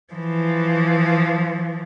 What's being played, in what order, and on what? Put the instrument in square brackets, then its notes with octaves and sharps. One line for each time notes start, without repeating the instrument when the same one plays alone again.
[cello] E3 F3